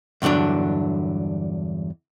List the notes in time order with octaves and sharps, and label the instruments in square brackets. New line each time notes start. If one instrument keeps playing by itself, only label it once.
[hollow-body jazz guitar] E2 G2 D3 F#3 D4